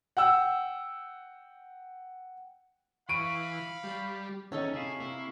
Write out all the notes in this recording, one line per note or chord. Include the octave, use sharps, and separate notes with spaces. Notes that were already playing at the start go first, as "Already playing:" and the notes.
F#5 G5 E6
E3 F5 B5 C#6 D7 D#7
G3
E2 D#3 C#4 D#4 A4 C#5
C3 E4 G4 G#4 F5 C#6
C3 A#3 E4